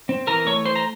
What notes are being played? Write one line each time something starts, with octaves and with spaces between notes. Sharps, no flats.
C4
E3 A#4 A#5
A3 C#5 C#6
E3 C5 C6
A#5